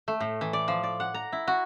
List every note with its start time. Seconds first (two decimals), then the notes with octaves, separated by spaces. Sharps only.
0.08 A3
0.20 A2
0.41 E3
0.53 D5
0.68 F3
0.83 D5
1.00 F#5
1.14 A#5
1.33 E4
1.47 F#4